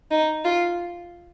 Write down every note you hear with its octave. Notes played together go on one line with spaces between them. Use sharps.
D#4
F4